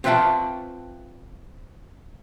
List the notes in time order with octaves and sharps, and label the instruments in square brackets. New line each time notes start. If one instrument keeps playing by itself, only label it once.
[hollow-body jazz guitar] C4 F4 B4 E5 G5 A5